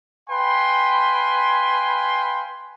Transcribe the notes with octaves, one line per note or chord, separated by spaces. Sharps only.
B4 F5 G5 G#5 B5 C6